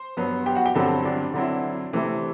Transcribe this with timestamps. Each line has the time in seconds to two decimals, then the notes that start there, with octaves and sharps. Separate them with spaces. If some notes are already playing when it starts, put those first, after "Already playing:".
Already playing: C5 C6
0.17 G2 F#3 B3
0.46 G4 G5
0.55 F#4 F#5
0.65 G4 G5
0.75 G2 D3 F#3 C4 A4 A5
1.05 D4 D5
1.34 D3 F#3 C4 E4
1.93 C3 E3 A3 C4